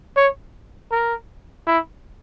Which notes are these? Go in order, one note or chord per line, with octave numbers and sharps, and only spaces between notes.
C#5
A#4
E4